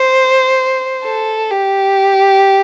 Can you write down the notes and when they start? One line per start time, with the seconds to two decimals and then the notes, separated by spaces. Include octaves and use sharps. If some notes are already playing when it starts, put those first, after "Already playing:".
Already playing: C5
1.05 A4
1.51 G4